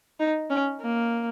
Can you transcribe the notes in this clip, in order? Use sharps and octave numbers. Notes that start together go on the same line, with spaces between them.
D#4
C#4
A#3